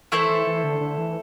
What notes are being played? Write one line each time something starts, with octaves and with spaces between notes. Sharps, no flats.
E3 A3 E4 A4 C5
E3
E3
D3
D3
E3